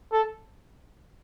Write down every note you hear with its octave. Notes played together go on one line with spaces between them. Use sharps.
A4